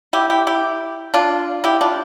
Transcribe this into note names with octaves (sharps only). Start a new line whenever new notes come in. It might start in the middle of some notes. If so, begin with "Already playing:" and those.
E4 G4
E4 G4
E4 G4
D4 F4
E4 G4
D4 F4